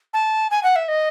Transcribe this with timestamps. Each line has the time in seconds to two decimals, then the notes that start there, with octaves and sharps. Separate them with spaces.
0.13 A5
0.51 G#5
0.63 F#5
0.76 E5
0.88 D#5